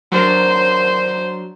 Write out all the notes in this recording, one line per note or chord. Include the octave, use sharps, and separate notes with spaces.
F#3 D4 A#4 C5